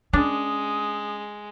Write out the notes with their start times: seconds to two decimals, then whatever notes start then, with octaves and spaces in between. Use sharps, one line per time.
0.13 G#3 C#4 D4 D#6